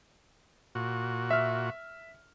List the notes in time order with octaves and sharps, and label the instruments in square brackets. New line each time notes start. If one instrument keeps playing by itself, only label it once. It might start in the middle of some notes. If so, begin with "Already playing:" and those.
[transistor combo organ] A#2 F#4
[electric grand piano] E5 F6